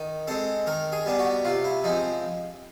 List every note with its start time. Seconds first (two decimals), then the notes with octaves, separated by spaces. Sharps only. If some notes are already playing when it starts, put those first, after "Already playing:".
Already playing: D#3
0.27 G#3 C4 A4
0.67 D#3 A#4
0.92 G#4
1.06 G3 B3 D4
1.19 F#4
1.45 C3 F4
1.64 E4
1.84 F3 G#3 C4 D#4